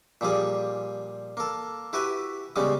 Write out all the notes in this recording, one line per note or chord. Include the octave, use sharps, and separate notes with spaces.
A#2 F3 G3 G#4
A#3 A4
E4 F#4 G4 B4 G#5
C#3 G3 G#3 B3